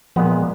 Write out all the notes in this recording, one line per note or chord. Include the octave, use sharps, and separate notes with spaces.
A#2 F3 G#3 B3